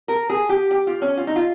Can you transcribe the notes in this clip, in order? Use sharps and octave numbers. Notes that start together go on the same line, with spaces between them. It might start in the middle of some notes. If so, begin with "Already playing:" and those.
A#4
G#4
G4
G4
F4
C#4
F4
D#4
F4